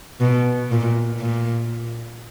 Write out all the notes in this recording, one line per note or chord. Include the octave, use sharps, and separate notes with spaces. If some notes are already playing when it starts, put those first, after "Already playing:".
B2
A#2
A#2